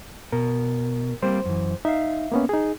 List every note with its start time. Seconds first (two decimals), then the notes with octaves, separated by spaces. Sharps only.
0.32 B2 A#4
1.23 G3 A#3 C4 C5
1.46 F#2 E3
1.85 D#4 E5 F5
2.32 A#3 B3 C#4
2.49 D#4 G#4